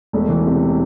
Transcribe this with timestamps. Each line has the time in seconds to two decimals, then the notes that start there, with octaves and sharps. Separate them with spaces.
0.13 E1 A3
0.29 E3
0.46 C3